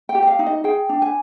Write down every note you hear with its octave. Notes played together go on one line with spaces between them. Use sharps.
G5
G4
D#5
F5
D#4
D#5
G#4 G5
D4
G#5